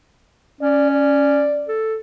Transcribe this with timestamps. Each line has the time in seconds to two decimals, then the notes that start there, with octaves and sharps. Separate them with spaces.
0.61 C#4 D5
0.91 D5
1.68 A4